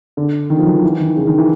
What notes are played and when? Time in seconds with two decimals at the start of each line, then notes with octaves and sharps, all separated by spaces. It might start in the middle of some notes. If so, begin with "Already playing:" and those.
0.17 D3
0.50 D#3
0.58 F3
0.67 F#3
0.75 F3
0.84 E3
1.00 D#3
1.16 C#3
1.27 D#3
1.38 E3